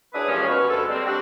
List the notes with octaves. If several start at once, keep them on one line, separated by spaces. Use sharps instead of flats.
F#2 D4 E4 G#4 B4 D#6
D#2 A#2 E3 F3 G#3 C#4
B2 B4 C#6 F6
D2 G#3 A4
D3 G3 G#3 A#3 C4
G3 C4 D4 F#4